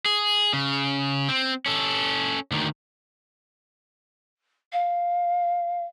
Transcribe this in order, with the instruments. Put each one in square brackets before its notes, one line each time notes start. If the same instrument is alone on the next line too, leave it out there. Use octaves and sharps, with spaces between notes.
[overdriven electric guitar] G#4
C#3
C4
C#4 A4
D2 D#3
[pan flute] F5